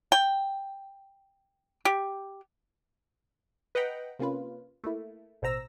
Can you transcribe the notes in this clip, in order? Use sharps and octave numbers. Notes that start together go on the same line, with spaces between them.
G5
G4
B4 D#5 F#5 G5 A#5 B5
C3 A#3 C#4 F4 B4
A3 A#3 E4
A1 B2 C5 A#5 E6 A#6